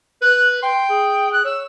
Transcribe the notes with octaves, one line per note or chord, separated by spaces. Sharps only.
B4 F#6
G5 C6
G#4
F#6
C#5 E6